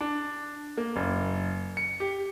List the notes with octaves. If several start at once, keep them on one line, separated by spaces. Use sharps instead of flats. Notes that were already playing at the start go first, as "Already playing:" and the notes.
D4
A#3
F#1
C#7
G4